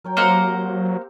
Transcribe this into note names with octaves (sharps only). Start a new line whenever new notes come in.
F#3 A#4 C#5 G5
A#3 C4 G4 C5 F#5 A#5